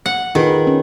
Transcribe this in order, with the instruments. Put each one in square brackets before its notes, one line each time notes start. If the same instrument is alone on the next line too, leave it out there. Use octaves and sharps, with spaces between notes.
[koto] F#5
[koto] D#3 [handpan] F4 G#4 B4
[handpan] C#4